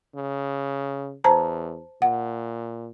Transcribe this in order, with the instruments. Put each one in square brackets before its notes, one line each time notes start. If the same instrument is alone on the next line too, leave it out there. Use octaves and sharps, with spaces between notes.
[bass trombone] C#3
[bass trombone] E2 [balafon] C5 A5 A#5
[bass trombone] A#2 [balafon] F#5